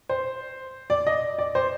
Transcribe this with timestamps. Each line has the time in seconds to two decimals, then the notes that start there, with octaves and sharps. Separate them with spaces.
0.09 C5
0.90 D5
1.07 D#5
1.39 D5
1.55 C5